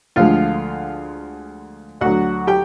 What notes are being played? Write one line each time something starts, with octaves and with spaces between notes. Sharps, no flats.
D2 D3 F3 G#3 F4 F5
D2 D3 F#3 F#4 F#5
G4 G5